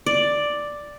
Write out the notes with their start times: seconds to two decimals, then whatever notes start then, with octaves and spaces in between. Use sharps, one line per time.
0.06 D5